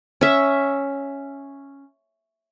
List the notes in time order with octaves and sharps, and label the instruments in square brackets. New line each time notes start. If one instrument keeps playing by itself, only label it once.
[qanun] C#4 E5